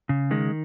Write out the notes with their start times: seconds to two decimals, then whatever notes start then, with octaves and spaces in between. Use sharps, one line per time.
0.09 C#3
0.31 D#3 G#3